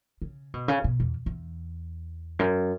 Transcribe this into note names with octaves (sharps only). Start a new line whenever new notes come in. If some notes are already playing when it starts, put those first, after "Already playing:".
C#3
B2
C#3
B2
E2
E2
F#2